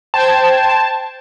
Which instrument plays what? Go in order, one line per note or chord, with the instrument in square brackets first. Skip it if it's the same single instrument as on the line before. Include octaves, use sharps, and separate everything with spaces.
[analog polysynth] C5 G5 G#6 [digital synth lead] A5